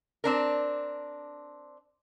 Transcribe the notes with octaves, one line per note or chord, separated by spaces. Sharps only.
C4 D4 A#4